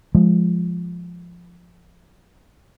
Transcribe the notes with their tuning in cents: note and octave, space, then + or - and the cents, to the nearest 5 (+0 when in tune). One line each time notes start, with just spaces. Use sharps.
F3 +0 G#3 +0